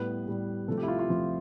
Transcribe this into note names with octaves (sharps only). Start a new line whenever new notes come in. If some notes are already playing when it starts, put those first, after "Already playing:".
Already playing: A2 G3 B3 B4
A2 G3 B3
C3 F3 A3 A4
G4
E4
F4
F4
C3 F3 A3